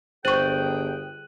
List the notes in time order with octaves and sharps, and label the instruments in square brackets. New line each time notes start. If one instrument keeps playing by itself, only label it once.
[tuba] G1 [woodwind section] G#4 G5 [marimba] C5 C#6 [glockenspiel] F#6 D#7 F#7